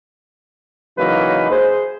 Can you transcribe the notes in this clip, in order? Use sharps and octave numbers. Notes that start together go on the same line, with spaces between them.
C#3 E3 F#3 A#3 D#4 B4
G#4 C5